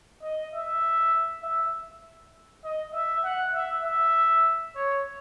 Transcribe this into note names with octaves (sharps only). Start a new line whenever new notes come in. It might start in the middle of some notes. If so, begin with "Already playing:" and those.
D#5
E5
E5
D#5
E5
F#5
E5
E5
C#5